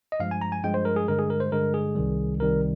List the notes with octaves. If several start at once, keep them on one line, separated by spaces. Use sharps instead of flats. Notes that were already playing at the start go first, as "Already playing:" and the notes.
D#5
G2 F3 G#3 F5
G#5
A#5
G#5
G2 F3 G#3 G5
C5
A#4
G#4
G2 D3 G#3 A#4
G#4
A#4
C5
G2 D3 G#3 A#4
G#4
C2 C3 D#3 G3
C2 C3 D#3 G3 A#4